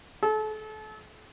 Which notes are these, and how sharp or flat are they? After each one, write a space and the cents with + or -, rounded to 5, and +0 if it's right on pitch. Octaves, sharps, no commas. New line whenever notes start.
A4 -35